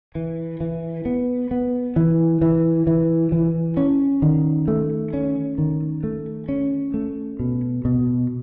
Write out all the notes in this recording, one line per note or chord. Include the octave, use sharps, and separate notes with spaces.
E3
E3
B3
B3
E3
E3
E3
E3
C#4
D#3
A3
C#4
D#3
A3
C#4
A3
B2
B2